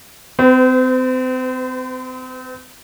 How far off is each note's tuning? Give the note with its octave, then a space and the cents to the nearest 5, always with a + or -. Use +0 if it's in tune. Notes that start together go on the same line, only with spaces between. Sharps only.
C4 -35 B4 +40